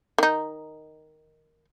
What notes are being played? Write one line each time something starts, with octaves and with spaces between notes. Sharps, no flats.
D#3 D#4